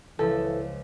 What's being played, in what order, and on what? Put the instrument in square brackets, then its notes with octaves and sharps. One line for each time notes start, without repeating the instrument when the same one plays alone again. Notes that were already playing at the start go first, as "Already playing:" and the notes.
[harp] C#2 C#3 F3 [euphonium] E3 [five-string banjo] A4